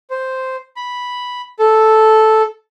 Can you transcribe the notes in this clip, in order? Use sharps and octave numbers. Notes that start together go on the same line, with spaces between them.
C5
B5
A4